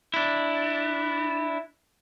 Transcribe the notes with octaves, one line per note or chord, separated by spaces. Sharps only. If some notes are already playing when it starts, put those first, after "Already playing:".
D4 E4